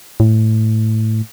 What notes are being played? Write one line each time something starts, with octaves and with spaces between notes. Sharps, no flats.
A2